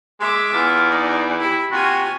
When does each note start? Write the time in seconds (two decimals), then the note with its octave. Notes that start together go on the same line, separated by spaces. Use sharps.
0.20 G#3 E5 D6
0.53 E2 F4
0.90 D#4 D5
1.40 E4 G4 B5
1.72 C3 F4 F#4 G#5